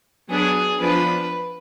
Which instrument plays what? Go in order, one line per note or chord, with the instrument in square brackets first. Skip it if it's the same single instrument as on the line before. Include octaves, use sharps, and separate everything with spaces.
[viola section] F#3 B3 D4 [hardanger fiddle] G#4
[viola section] F3 B3 D4 F4 [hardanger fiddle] B4